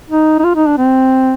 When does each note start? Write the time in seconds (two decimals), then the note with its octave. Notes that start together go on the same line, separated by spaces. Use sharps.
0.10 D#4
0.39 D#4
0.44 F4
0.56 D#4
0.67 D4
0.77 C4